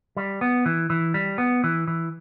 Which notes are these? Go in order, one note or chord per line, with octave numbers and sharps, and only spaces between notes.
G3
B3
E3
E3
G3
B3
E3
E3